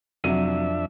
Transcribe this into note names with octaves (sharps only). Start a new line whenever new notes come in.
F2 C3 F#3 D4 E5 D#7